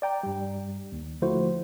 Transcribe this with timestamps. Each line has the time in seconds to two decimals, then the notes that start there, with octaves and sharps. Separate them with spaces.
0.02 D5 G5 A#5
0.23 G2 G3
0.92 D#2
1.22 D3 F3 A3 E4 F#4 C5